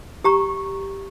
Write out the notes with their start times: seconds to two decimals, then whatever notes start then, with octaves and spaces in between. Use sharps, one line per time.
0.24 G4 A#5 C#6